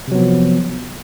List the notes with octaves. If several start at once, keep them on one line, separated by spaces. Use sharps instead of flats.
C3 F3 F#3 B3